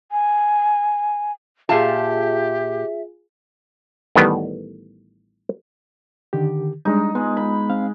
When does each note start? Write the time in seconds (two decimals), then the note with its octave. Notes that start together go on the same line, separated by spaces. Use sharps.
0.12 G#5
1.69 A#2 F4 G4 G#4 E5 F5 A5
4.15 A1 A2 D#3 G3 B3
6.33 D3 D#3 G4
6.85 G3 G#3 D4 D#4
7.15 G#3 B3
7.37 B5
7.70 C4 F5